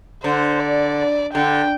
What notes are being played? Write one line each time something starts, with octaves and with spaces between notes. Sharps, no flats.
D3 C5
D5
D3 G5